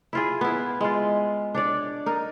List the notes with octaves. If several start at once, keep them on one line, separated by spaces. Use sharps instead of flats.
E4 F4 G#4
B3 E4
G#3 F4
D4 C#5 D5
D#4 A#4